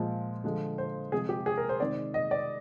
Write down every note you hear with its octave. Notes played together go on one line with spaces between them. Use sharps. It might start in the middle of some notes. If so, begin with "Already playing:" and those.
Already playing: A#2 F3 G#3
D3 F3 G#3
C5
C3 F3 G#3 G#4
G4
G#4
A#4
C5
C3 D#3 G#3 D5
D#5
D5